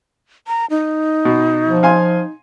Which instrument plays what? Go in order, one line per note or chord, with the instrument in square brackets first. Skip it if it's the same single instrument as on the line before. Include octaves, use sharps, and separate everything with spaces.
[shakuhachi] A#5
D#4
[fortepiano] B2
[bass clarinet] F3
[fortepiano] F5 G#5 C6